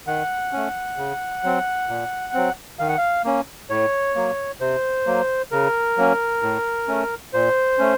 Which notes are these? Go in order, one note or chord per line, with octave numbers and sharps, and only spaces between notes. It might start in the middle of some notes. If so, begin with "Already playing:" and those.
D#3 F#5
A3 C#4
C#3
F#3 C4
A#2
F#3 C4
D#3 F5
F#5
F5
A#3 C#4
A2 C#5
F#3 A#3
C3 C5
F#3 A#3
C#3 A#4
F#3 A#3 C#4
A2
A3 C#4
A#2 C5
A3 C#4